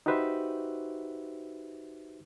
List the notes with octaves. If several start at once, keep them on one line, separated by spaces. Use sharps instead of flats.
D#4 F#4 G4 B4 C5 E5